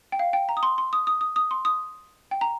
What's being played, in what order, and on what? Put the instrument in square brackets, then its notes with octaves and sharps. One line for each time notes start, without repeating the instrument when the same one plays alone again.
[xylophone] G5
F5
G5
A#5
D#6
C6
C6
D#6
D#6
D#6
D#6
C6
D#6
G5
A#5